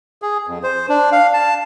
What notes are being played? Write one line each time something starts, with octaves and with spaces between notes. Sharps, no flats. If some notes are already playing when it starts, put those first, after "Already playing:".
G#4
F2
C5
D4
F5
A5